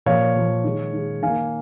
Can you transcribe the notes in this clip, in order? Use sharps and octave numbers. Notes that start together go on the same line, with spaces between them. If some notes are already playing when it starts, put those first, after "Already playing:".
A#2 F3 A#3 C#5 F5
A#2 F3 A#3
D#3 G#3
D#3 G#3
D#3 A#3 F5 G#5